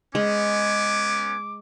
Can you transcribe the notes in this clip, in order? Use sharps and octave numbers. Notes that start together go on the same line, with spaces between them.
G#3 B3 C#4 G#5 D6